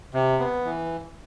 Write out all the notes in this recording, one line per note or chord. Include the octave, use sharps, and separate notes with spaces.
C3
B3
E3